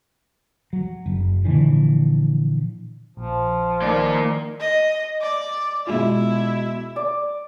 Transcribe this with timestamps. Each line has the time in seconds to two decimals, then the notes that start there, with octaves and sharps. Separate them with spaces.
0.73 F#3
1.06 F#1
1.45 A#2 D3 E3 F3
3.17 A#1 F3
3.82 D#3 A#3 D5
4.60 D#5
5.21 D5
5.87 B2 G#3 E4 F4
6.96 D5